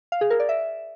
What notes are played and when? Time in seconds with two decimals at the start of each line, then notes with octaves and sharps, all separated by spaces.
0.12 F5
0.21 G#4
0.30 A#4
0.40 D5
0.49 E5